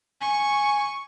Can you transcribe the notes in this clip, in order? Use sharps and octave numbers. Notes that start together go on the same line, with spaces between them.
G#5 C#6